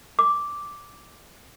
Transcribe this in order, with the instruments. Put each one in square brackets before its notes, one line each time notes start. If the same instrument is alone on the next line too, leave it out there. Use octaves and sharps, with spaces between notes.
[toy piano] D6